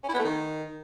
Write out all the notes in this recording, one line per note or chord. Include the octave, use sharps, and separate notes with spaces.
C#4
E4
B3
A3
D#3